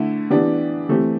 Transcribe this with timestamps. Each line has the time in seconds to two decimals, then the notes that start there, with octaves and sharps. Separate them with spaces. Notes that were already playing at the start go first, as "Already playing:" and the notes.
Already playing: D3 A3 E4
0.30 E3 B3 D4 G4
0.89 E3 A3 C4 G4